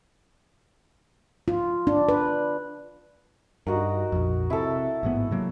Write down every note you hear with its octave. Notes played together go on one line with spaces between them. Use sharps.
F4
D4
B4
G2 D#4 F#4 A#4
A#1 F2
C3 E4 A4
A1 G#2 B3
C3 F#3 A#3